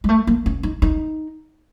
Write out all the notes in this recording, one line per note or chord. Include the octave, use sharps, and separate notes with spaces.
G#3
A3
A#3
C#4
D#4
D#4